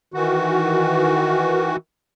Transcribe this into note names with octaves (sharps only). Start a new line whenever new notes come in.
D#3 E3 F#4